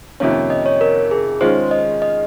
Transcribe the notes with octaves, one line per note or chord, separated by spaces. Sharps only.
F2 C3 D#3 A#3 C#4 C#5
D#5
C#5
A#4
G#4
D#3 G#3 C#4 F4 C5
D#5
D#5